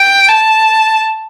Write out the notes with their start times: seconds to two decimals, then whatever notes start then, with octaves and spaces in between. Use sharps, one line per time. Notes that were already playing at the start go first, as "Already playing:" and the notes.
Already playing: G5
0.29 A5